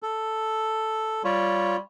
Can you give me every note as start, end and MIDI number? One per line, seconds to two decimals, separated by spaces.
0.03 1.23 69
1.24 1.79 55
1.24 1.76 65
1.24 1.76 73